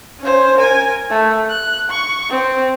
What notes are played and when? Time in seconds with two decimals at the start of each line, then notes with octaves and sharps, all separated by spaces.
0.21 C#4 C5
0.57 A#4 G#5
1.10 A3
1.50 F#6
1.90 C#6
2.29 C4